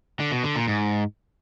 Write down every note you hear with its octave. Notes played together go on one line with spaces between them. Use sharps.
D3
B2
D3
A#2
G#2